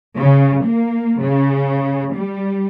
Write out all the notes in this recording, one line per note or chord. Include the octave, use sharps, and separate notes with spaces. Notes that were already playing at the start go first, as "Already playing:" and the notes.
C#3
A#3
C#3
G3